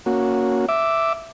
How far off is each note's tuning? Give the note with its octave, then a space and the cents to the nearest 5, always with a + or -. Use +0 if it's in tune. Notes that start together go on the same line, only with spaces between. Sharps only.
A#3 +0 C#4 +5 F#4 -15
E5 +0 D6 +0